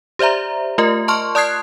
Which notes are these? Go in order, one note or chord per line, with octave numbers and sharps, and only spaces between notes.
G4 C5 D5 E5 A#5
A3 F4 A#4 D#5
A5 C6 C#6 F6
D5 A5 D#6 F#6 G#6 C7